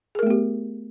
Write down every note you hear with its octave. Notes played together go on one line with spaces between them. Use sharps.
A3 B3 G4 G#4 A#4